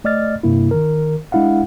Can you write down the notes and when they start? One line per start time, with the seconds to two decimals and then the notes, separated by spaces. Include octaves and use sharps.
0.04 A3 D5 D#5 F6 A6
0.43 G2 C3 A#3 E4
0.71 D#3 A#4
1.32 G#3 D4 E4 F5 F#5